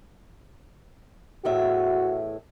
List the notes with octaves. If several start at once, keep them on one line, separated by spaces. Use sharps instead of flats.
E2 A2 F#4 E5